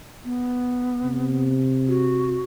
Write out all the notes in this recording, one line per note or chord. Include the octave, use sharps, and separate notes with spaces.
B3
C3
F#4